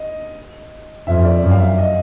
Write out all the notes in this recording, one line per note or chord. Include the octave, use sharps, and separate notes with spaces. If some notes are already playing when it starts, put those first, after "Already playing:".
Already playing: D#5
F2 E5
D5
F#2
F5
E5
D#5